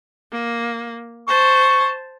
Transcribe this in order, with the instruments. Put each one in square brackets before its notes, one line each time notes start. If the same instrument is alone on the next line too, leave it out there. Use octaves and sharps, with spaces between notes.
[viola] A#3
[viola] C5 A5 [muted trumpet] C#6